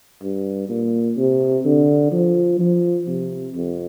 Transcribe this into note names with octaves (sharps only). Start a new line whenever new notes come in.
G2
A#2
C3
D3
F3
F3
C3
F2